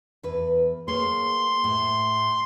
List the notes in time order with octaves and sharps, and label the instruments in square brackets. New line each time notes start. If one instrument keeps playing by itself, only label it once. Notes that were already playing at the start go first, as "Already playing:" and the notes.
[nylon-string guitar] E2 B4
[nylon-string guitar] A#3 G#4 C#5 [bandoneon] C6
[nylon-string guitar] A2